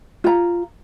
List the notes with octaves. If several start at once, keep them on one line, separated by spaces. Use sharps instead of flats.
F4 A#5